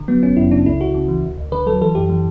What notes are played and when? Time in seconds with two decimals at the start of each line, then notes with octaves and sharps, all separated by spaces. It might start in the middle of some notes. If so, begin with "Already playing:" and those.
Already playing: D3
0.08 F#3 B3
0.23 G1 C#4
0.37 F#2 E4
0.52 C#3 D4
0.66 C#2 E4
0.81 C#2 F#4
0.94 C#3
1.08 E3
1.23 D2
1.38 D2
1.52 D3 B4
1.66 F#3 A4
1.82 E3 A4
1.95 F#2 G4
2.09 E3